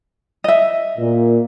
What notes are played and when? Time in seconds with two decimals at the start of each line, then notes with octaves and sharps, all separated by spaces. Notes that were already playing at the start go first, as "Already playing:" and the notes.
0.44 D#5 E5
0.98 A#2